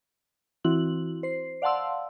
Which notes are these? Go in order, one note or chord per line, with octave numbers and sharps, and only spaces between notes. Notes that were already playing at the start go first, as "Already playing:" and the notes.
E3 C4 E4 F#4 F#7
C5 C7
D5 F5 F#5 A5 C6 E6